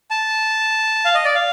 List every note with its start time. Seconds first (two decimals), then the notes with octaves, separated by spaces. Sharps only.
0.11 A5
1.05 F5
1.15 D#5
1.25 D5
1.35 F5